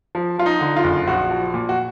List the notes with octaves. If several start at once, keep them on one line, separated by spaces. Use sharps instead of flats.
F3
F3 F4
D#4
D3
F4
F#1
A#1 F#4
F3
A#2
F#4